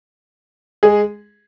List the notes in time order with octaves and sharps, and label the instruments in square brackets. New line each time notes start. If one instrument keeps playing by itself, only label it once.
[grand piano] G#3 G#4